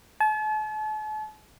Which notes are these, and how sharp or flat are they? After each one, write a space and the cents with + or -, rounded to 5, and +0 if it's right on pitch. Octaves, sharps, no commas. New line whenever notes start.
A5 -40